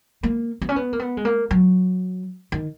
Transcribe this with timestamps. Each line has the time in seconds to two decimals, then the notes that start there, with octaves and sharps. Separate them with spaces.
0.23 A#3
0.62 B3
0.69 C#4
0.76 B3
0.93 A#3
1.00 B3
1.17 G#3
1.25 A#3
1.51 F#3
2.52 D#3